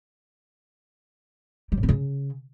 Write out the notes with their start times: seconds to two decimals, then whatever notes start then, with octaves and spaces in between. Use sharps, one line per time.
1.72 G3
1.77 A2
1.83 C4
1.89 C#3